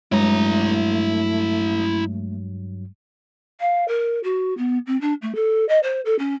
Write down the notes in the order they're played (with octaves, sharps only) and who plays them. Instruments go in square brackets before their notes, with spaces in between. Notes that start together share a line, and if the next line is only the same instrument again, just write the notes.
[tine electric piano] G2 F#3 [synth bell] G#3 [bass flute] A3 [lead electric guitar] E4 A#5
[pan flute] F5
A#4
F#4
B3
C4
D4
A3
A4
D#5
C5
A4
C#4